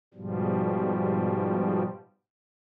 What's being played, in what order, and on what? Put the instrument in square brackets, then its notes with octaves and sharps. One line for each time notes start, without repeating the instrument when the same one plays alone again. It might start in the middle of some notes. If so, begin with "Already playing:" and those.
[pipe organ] G#2 B2 F3 G3